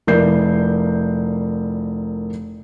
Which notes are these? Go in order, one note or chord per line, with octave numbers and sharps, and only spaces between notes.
F1 E4 A#4 D5 G6 C7